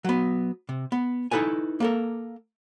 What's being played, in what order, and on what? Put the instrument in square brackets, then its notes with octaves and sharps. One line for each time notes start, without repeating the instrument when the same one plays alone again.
[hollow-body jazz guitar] F#3 B3
C3
B3
D#4 E4 A4 B4 G#5
A#3 A4 A#4